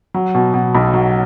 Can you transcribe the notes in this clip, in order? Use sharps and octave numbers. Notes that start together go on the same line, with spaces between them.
F#3
B2
B2
B1
F#3